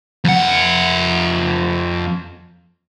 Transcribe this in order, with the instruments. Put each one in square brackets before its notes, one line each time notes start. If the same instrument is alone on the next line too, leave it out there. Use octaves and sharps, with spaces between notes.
[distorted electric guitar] F2 F#5